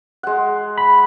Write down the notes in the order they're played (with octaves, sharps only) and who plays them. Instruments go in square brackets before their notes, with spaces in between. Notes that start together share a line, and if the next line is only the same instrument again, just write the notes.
[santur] G#3 F#5
[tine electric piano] B5